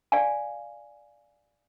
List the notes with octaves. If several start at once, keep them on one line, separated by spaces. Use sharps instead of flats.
D5 F5 G#5